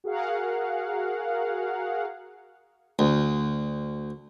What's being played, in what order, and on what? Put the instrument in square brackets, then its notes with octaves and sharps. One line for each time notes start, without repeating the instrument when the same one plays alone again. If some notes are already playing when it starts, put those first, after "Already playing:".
[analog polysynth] F#4 G#4 A#4 F5 F#5
[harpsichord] D2